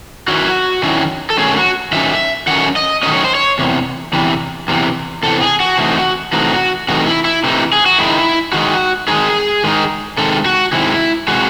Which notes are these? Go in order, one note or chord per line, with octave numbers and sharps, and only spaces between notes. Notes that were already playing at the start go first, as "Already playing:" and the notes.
D#3 F#3 C#4 E4 F#4
D#3 F#3 C#4 E4
A4
D#3 F#3 A3 C#4 G#4
F#4
D#3 F#3 A3 C#4 E5
D#3 F#3 A3 C#4 F#5
D#5
D#3 F#3 A3 C#4 D#5
C#5
C5
C#5
E2 C3
E2 C3 E3
E2 C3 E3
E2 C3 E3 A4
G#4
F#4
C3 E3 A3 D#4
C3 E3 A3 D#4 F#4
C3 E3 A3 D#4 F#4
E4
E4
C3 E3 A3 D#4
G#4
F#4
D#3 G#3 D#4 E4
D#3 G#3 D#4 F#4
D#3 G#3 D#4 G#4
D#3 G#3 D#4
C3 D#3 G#3 A4
F#4
C3 D#3 G#3 E4
C3 D#3 G#3 F#4